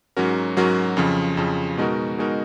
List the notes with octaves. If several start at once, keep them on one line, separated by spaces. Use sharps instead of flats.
G#2 F#3 C#4 F#4 A#4
G#2 F#3 C#4 F#4 A#4
F2 C#3 F3
F2 C#3 F3
B2 G#3 D#4 F#4 A#4
B2 G#3 D#4 F#4 A#4